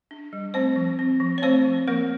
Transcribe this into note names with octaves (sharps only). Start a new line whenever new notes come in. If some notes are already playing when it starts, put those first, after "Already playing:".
D4
G3
A3 C4 C5
F3
C4
F3
C#5
A3 C4 C5
F3
F3 A#3 A#4